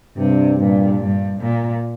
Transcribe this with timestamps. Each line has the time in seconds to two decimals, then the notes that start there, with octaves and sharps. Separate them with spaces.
0.17 G2 C3
0.58 G2 A#2
0.99 G2
1.40 A#2